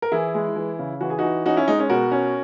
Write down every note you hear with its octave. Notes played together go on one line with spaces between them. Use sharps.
A#4
E3 E4 G#4
G#3
E3
C#3
E3 F#4
G#4
E3 D#4 F#4
C#4 D#4 F#4
C#4 E4
G#3 D#4
C#4
B2 F#4 A#4
C#4